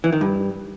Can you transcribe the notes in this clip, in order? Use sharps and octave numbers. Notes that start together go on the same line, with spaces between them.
E3
D#3
G2